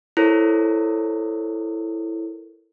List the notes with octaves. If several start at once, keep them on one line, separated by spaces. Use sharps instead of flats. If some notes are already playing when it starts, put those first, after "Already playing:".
E4 A4 A#4 C5 C#5